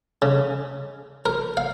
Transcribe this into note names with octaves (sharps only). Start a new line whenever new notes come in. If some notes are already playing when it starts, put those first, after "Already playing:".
C#3
A#4
F5